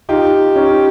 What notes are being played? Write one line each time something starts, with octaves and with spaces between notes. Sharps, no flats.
D#4 F4 G4
C#4 D#4